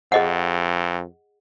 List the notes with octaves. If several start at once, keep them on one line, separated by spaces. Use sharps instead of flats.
F2 G#4 D#5 F#5